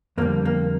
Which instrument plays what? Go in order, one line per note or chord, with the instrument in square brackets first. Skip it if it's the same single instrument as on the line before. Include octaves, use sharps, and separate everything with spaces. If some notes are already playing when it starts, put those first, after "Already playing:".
[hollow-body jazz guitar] F2 D3 G3 A#3
A#3